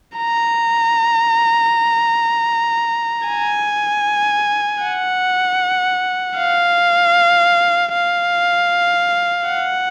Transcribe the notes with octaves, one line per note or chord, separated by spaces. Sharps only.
A#5
G#5
F#5
F5
F5
F#5